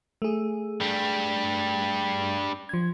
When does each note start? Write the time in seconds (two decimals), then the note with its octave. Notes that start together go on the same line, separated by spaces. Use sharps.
0.22 A3 G#4
0.80 G2 G3
2.69 F3 G#6